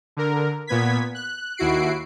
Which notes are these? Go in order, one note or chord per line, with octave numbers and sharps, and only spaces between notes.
D3 A#4
A#2 B3 G#6 B6
F#6
D#2 E4 F#4 C7 D7